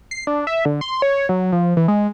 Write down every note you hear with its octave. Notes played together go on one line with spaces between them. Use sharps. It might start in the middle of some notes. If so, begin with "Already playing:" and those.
C7
D4
E5
D3
C6
C#5
F#3
F3
E3
G#3